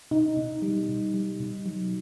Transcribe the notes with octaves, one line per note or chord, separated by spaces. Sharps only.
B2 D#4
B2
G3
B2
G3
B2
F#3